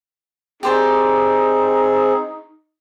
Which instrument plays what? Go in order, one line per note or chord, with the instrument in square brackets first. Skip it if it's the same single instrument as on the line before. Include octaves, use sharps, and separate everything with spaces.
[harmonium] C4 G#4 [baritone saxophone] D#4 [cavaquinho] G4 C5 D5